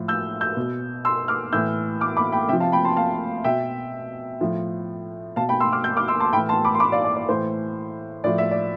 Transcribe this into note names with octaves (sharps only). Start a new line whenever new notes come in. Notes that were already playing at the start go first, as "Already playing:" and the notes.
Already playing: A2 F3
E6 G6
E6 G6
B2
C6 E6
D6 F6
A2 E3 E6 G6
D6 F6
B5 D6
G5 B5
C3 F3 E5 G5
F5 A5
G5 B5
A5 C6
F5 A5
B2 E5 G5
A2 F3
B2 F5 A5
G5 B5
C6 E6
D6 F6
E6 G6
D6 F6
C6 E6
A5 C6
A2 E3 G5 B5
A5 C6
B5 D6
C6
B5 D6
D5 F5
D5
D5
A2 E3 C5
A2 F3 D5
E5
D5